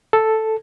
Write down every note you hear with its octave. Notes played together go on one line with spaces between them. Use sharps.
A4